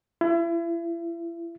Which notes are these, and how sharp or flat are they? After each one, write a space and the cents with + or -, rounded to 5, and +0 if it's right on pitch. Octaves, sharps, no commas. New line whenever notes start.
E4 +35